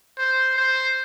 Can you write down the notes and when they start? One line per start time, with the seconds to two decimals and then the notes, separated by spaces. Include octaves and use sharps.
0.18 C5
0.56 C5